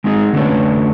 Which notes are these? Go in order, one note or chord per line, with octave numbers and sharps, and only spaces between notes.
G#3 C4 D#4 G#4
D3 A3 C#4 D4 B4 C#5